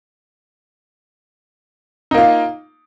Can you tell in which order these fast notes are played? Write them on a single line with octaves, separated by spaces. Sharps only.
D#4 A#3 F4